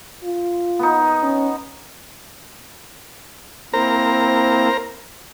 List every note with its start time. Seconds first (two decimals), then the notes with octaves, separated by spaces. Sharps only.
0.24 F4
0.79 B3 D#4
1.23 C#4
3.74 A#3 C4 E4 A#4 C5 A#5